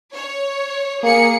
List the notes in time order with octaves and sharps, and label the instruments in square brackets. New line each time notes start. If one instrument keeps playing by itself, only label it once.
[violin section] C#5
[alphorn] A#3 [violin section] G#4 C#7